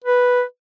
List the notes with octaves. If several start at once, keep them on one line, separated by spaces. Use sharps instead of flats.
B4